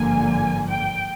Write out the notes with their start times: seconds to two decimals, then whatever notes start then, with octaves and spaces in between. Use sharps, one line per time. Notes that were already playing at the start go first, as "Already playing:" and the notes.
Already playing: G#1 G2 D3 F3 A#3 G#5
0.68 G5